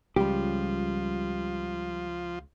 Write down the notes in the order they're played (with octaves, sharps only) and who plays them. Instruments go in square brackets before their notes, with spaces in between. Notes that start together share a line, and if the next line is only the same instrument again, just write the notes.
[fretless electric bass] C#2 [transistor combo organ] F3 F4 [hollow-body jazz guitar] G3 G4